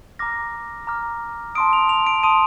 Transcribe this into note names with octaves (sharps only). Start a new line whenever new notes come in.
A#5 D6 F6 A#6
A#5 D6 F6
A5 C6 D#6 D7
F7
F7
D7
A5 C6 D#6 D#7